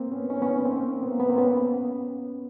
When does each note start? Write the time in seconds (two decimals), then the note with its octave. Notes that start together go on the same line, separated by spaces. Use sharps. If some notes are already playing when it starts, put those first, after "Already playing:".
Already playing: A#3 C4
0.12 B3 C#4
0.30 C#4 D#4
0.42 B3 C#4
0.65 A#3 C4
1.03 B3
1.12 A#3
1.20 B3
1.29 A#3 C4
1.38 B3 C#4